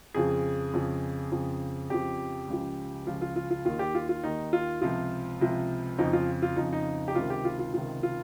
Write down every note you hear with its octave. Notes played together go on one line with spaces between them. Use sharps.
F2 C#3 F3 G#4
F2 C#3 F3
F2 C#3 F3
F2 C#3 F3 G4
C#2 C#3 F3
C#2 C#3 F3 F4
F4
F4
F4
D#2 D#3 F4
G4
F4
F4
D#2 D#3 D#4
F4
C#2 C3 F3 F4
C#2 C3 F3
F2 C#3 F3 D#4
F4
F4
F2 C#3 F3 D#4
D#4
G4
C#2 C3 D#3 F4
G4
F4
F4
C#2 C3 D#3 F4
F4